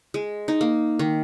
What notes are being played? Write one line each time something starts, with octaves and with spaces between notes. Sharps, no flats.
G#3
D#4
A#3
D#3